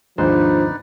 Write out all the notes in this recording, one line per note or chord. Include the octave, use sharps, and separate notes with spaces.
D#2 G#2 F3 D4 D#4 B4 C5 D5